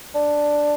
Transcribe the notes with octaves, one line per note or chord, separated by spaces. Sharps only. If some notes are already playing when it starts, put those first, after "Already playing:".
D4